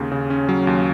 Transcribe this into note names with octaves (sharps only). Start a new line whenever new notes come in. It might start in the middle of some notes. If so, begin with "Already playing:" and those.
Already playing: D#2 C#3
C#3
C#4
F#3
D#2